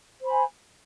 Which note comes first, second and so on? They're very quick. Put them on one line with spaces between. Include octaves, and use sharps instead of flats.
C5 B5 G#5